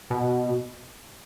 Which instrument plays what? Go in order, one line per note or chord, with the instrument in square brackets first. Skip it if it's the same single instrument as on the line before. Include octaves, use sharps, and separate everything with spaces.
[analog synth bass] B2